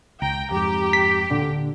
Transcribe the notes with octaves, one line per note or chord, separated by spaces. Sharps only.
C#2 G5 A#5
F2 G#2 G4
B6
D1 A#2 D3 D4